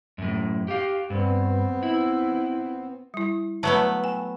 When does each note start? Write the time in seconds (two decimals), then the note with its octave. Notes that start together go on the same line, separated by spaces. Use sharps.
0.18 F#2 A2
0.68 G4 F5
1.10 G2 B3 C4
1.83 E4
3.14 G3 E4
3.63 F#3 A3 B3 B4 E5 A5
4.04 G5 G#5